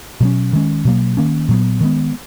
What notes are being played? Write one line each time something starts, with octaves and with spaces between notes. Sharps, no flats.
B2 F#3 C#4
D#3 G#3 C#4
B2 F#3 A#3
D#3 A#3 C#4
A#2 F#3 B3
D#3 G#3 B3